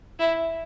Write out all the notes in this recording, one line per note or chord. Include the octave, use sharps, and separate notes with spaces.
E4